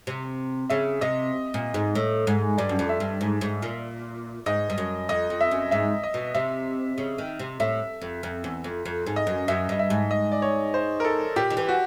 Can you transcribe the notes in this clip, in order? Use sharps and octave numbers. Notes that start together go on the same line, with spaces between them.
C3
C#3 E5
C3 D#5
A#2
G#2
A2
G#2
G2 D5
F#2
F2
E5
G2
G#2
G#2
A#2
G#2 D#5
G2
F#2
F2 D#5
F2
E5
F#2
G#2 E5
D#5
B2
C3 E5
C#3
D#3
C3
A2 E5
F2
F2
E2
F2
F2
G#2
D#5
F#2
F#2 E5
G2 D#5
E5
G#2
D#5
D5
C#5
C5
A#4
A4
A#2 G4
D#3
E3
F#4